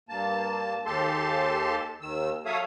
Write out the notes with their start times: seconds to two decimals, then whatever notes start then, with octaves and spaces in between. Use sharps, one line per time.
0.09 G2 A#3 A5
0.86 D#2 G#3 G4 A4 A5 C6
2.01 D#2 D#3 E6
2.45 F#3 A4 C#5 E5 F5 D#6